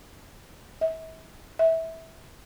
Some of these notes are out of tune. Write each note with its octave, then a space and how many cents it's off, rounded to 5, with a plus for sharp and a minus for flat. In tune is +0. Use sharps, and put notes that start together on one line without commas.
E5 -40
E5 -20